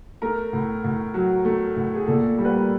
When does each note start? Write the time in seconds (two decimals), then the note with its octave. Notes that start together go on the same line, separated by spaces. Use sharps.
0.22 A3 A#4
0.53 A2
0.84 A2
1.14 F#3
1.45 A3
1.76 A2
1.95 G#4
2.07 A#2 A4
2.38 G3
2.45 B4
2.54 A#4